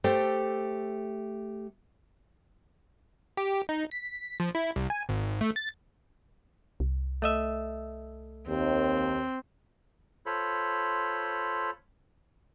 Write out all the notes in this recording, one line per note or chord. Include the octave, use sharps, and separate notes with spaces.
A3 G4 A4 C5 G5
G4
D#4
B6
F3
E4
C2
G#5
G#1
A3
A6
C2
A3 D#5 E5
D#2 C4
F4 A4 C5 C#5 B5